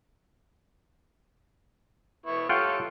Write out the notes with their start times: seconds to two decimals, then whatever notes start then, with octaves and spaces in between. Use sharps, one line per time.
2.26 B3 E4 C#6
2.49 F4 G4 A4 C#5 F#5 G5